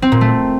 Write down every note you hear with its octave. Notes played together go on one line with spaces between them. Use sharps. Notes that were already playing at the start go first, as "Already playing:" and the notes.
C4
A#2
A3